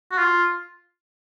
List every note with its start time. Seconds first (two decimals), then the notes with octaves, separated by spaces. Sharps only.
0.11 F#4
0.18 F4